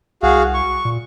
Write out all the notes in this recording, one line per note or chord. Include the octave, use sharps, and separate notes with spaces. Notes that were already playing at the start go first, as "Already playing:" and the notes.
C2 F#4 G#4 F5
C#6
A#2